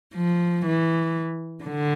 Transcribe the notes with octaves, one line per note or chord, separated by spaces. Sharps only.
F3
E3
D3